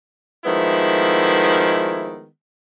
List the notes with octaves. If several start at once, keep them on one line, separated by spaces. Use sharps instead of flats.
D#3 F3 G#3 A3 B3 E4